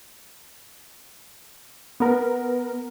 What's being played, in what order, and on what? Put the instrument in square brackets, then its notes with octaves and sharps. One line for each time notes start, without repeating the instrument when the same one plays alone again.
[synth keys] B3 A#4